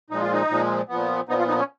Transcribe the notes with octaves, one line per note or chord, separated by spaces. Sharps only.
A#2 F3 G#3 D#4
F4
D#4
A#2 F3 G#3
A#2 F3 B3
A#2 F3 B3 D#4
F4
D#4
C#4